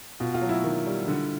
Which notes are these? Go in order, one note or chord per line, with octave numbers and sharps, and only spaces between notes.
B2 F4
F4
F#3
E4
D#3
G3
D3